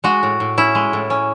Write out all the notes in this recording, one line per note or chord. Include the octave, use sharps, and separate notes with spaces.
G#3 F#4
A2
A2
C#4 E4
G#3
A2
C#4